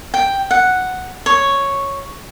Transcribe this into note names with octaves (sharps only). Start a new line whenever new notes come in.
G5
F#5
C#5